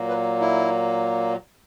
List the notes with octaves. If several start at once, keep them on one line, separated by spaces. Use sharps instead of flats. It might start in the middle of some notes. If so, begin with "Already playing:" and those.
Already playing: A#2 F#3 A#3
B4
E4